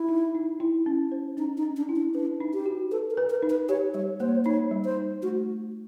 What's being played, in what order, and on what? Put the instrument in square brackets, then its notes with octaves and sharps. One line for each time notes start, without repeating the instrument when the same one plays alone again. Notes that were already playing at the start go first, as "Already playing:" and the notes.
Already playing: [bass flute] E4
[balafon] D#4
D#4
E4
C#4
C5
[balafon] C#4 [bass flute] D#4
[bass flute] D#4
[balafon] C#4
[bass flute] D4
[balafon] E4
[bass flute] D4
[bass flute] D4 [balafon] B4
[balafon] D#4
[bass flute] G4
[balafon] F#4
[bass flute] A4 [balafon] B4
[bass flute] A#4
[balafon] B4
[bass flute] A#4
[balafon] D#4
[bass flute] B4
[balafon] G4 [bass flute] C#5
[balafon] G3 [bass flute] C#5
[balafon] A#3 [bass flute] C5
[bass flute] C#5
C5
[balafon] D#4 [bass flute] C#5
[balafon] G3
[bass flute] C5
[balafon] D#4
[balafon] A3 [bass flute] F#4